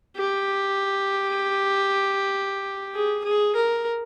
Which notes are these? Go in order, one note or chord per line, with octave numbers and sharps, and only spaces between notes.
G4
G#4
G#4
A#4